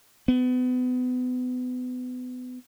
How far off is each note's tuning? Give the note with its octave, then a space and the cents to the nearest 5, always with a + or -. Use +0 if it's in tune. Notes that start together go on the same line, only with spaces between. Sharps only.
B3 +30